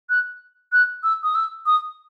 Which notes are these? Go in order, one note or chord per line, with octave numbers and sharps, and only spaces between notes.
F#6
F#6
E6
D#6
E6
D#6